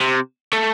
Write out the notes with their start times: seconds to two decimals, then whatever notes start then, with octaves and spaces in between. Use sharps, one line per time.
0.01 C3
0.53 A3